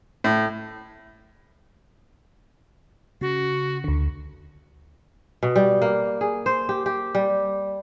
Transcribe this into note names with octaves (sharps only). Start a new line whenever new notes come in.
A2
C#3 F#4
D2 D3
B2
G3
A#3
G#4
C5
G4
G4
G3